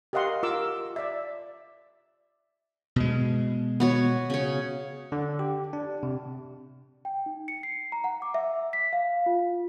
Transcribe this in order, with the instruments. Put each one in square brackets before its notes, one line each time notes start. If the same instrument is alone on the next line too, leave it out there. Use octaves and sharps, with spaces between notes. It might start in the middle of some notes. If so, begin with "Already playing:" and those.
[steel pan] G4 A#4 D#5 F5 F#5 C6
F4 A#4 D6 E6
D5 E5
[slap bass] B2 G#3
[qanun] B3 F#4 C#5
C#3 C#5
[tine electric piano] D3
G4
D4
C3
[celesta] G5
D#4
C#7
C7
A#5
F#5
D6
E5
B6
F5
F4